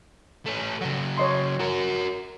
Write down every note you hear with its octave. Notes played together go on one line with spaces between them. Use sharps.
A3 C#4
C#3 F#3
C#5 D#5 C6
F#4 A#4